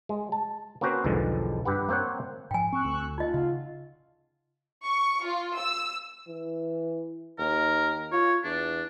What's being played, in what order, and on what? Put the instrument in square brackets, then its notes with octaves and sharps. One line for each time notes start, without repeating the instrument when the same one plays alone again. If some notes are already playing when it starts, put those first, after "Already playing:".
[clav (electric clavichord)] G#3
A5
A#3 C4 C#4 F#4 B4 C5
B1 E2 B2 D3 F3 G#3
G2 G4 B4 F#5
A#3 C4 C5 C#5 F#5
[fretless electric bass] G#2 F3 [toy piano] G5 G#5
[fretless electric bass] C4 [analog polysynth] C#6 E6 F#6
[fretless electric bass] D2
[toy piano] D#4 D#5 [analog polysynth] F4
[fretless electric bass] C#3 [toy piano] D#5 F#5
[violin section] C#6
F4
E6
[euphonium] E3
[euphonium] D#2 [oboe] A#4
[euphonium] F4 [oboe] C#5
[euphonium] E2 [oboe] D4